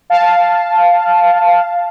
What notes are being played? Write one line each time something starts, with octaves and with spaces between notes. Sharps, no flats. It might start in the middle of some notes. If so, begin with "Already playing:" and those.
F5 A5